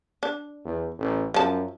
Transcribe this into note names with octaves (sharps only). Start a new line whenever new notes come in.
D4
E2
A1
F#2 F3 A5